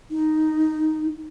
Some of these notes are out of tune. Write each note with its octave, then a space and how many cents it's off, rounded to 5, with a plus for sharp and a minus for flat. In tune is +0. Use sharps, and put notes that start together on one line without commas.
D#4 +0